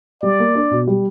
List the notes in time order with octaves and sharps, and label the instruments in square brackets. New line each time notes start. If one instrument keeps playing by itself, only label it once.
[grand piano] G3 [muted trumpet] D5
[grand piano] A#3
D4
B2
G3